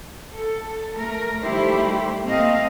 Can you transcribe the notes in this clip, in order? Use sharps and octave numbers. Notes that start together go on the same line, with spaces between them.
A4
A3 A#4
D#3 G3 A3 E4 G4 C5
A3 A#3 C4 D#5 F5